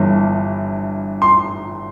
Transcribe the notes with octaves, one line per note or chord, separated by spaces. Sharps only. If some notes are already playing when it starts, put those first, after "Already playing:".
Already playing: G1 G2 E3
C6